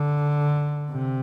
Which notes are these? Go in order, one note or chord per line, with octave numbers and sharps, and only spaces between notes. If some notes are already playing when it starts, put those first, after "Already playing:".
Already playing: D3
C3